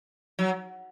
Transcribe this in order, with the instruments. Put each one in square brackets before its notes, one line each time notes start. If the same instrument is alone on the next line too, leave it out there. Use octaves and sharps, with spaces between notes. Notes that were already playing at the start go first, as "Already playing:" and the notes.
[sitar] F#3